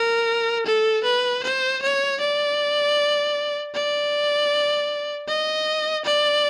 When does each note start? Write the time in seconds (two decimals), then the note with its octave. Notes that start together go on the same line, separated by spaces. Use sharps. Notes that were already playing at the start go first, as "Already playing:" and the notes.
Already playing: A#4
0.66 A4
1.04 B4
1.43 C5
1.82 C#5
2.20 D5
3.74 D5
5.28 D#5
6.04 D5